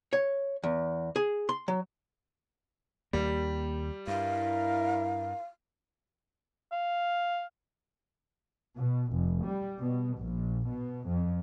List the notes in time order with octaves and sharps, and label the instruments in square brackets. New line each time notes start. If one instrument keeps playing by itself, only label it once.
[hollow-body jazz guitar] C#5
E2
G#4
C6
F#3
[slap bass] D#2 A#3 [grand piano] G3
[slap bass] G2 [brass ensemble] E4 A#4 [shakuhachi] F5
[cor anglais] F5
[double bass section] B2
F1
G3
B2
A#1
B2
F2